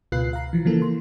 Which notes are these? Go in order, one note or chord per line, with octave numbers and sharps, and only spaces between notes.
C#2 B2 F4 B4 F#6 C7
F5 A#5
E3 F3
C#3 E3 F3 A#3 A4
C6